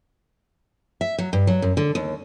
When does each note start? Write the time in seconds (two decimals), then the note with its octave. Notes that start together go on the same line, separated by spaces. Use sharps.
1.01 E5
1.18 F#3
1.33 G2
1.47 F#3
1.62 F#2
1.77 D3
1.95 D#2